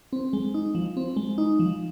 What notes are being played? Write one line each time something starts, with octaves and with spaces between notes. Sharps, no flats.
C4
G#3
D#4
F3
C4
G#3
D#4
F3